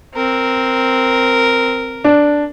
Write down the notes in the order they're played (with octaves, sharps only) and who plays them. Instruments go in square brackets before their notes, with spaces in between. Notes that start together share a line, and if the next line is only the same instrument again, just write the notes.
[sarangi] C4 [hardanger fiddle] A#4
[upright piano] D4